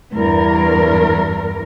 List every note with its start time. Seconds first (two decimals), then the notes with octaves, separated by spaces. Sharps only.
0.14 E2 G2 A#4